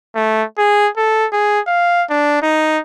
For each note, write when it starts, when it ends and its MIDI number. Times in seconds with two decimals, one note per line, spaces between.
0.15 0.43 57
0.58 0.88 68
0.97 1.26 69
1.32 1.60 68
1.67 2.04 77
2.10 2.41 62
2.42 2.78 63